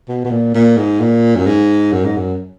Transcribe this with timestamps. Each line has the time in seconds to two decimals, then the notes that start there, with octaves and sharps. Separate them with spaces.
0.08 B2
0.24 B2
0.30 A#2
0.54 A#2
0.77 G#2
1.00 A#2
1.36 F#2
1.46 G#2
1.92 F#2
2.04 G#2
2.17 F#2